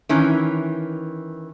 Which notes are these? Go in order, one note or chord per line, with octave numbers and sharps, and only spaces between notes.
D#3 E3 C#4